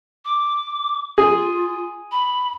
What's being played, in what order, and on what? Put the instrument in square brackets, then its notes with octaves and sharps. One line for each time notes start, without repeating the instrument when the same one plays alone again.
[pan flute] D6
[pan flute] F4 [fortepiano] G#4
[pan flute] B5